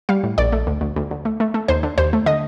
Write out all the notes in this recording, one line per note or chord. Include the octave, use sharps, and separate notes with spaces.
G3 F5
A2
A#1 D5
A3
D2
D2
D2
D2
A3
A3
A3
D#2 C5
D3
D#2 C5
A3
D3 D#5